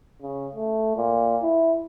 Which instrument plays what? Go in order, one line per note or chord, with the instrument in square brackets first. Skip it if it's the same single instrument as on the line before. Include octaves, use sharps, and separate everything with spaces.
[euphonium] C#3
A3
A#2
E4